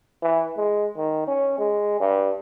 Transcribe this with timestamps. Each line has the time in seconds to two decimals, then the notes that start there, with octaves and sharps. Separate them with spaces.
0.22 E3
0.57 G#3
0.97 D#3
1.27 C#4
1.58 G#3
2.00 G2